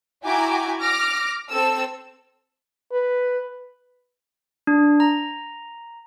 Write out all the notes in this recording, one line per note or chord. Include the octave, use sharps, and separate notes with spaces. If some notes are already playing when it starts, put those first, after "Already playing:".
E4 F#4 G5 G#5 A#5 D6
D6 F6 A#6
C4 A4 E6
B4
D4
A#5